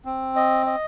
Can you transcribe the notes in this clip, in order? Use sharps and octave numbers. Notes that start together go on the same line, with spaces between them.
C4
D#5
D#5